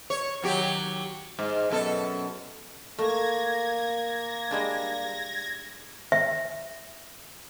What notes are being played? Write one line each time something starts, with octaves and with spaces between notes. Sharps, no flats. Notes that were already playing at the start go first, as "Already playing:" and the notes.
C#5
D#3 F#3 G4
G#2
F#2 B2 A4
A3 A#3 G#6 A#6
G3 G#3 D4
E5